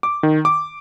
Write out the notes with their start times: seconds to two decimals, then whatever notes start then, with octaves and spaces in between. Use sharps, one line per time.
0.03 D6
0.23 D#3
0.45 D6